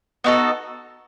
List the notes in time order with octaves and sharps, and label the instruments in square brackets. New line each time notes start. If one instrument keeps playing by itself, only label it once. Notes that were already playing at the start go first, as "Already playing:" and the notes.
[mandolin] B3 D#4 F#4 A4